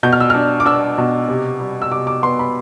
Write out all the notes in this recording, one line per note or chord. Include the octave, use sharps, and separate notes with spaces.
B2 G6
F6
E6
D4 F6
D6
D4 E6
B2
C3
G3
E6
C3 D6
D6
B3 C6
B5